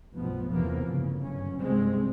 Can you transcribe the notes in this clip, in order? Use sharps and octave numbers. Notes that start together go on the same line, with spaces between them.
F1 B1 G2 B2 F3 B3
E2 C3 E3 F3 A#3 B3
G1 A2 C#3
G1 F#2 C#4
C2 G2 G#3 C4